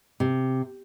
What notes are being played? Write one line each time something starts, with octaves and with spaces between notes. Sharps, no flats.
C3